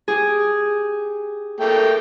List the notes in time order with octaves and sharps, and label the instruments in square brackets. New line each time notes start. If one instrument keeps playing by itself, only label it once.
[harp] G4 G#4
[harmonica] A3 A#3 G5